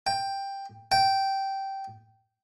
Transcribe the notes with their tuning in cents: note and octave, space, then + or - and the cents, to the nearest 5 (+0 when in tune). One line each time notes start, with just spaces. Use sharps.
G5 +10
G5 -10